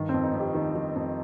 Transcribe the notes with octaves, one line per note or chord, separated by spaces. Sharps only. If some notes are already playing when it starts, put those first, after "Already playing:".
Already playing: G2 D#3
C4
F2
D#4
F2
G4
D#3
D#3
F2